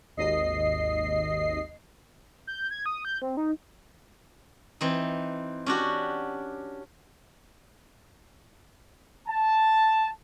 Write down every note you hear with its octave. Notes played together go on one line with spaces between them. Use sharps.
G#1 D#2 D#5 C7
G6
G#6
D#6
G6
C4
D#4
E3 C4 D#4
C#4 D4 F#4 G4
A5